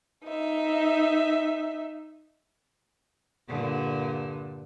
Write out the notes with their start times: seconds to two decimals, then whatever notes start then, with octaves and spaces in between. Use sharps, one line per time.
0.25 D#4 E5
3.48 G2 A#2 D3